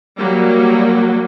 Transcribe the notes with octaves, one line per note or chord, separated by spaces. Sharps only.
F#3 G3 A#3